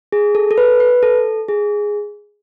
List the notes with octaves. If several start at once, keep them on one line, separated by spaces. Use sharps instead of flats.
G#4
A4
A4
B4
B4
A4
G#4